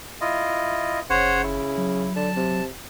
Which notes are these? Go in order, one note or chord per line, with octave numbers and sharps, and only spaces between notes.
E4 F4 D#5
F#1 C#3 C5 C#5 F#5
E4
F#3
D3 A5
C3